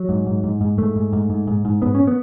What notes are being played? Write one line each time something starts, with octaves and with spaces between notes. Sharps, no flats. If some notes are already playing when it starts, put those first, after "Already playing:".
Already playing: F#3
G#2
G#2
G#2
G#2
G#2 A3
G#2
G#2
G#2
G#2
G#2
G#2 B3
C#4
B3